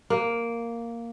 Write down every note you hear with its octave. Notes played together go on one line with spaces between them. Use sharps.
A#3